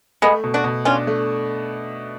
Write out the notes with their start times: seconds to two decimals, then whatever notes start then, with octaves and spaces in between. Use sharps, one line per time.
0.22 G#3 A3 B3
0.44 B2
0.54 D4 F#4
0.64 B2
0.85 C#4 D4 F4
1.07 A3